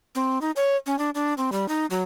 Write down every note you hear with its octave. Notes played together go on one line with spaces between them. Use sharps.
C4
D#4
C#5
C#4
D4
D4
C4
G3
D#4
F#3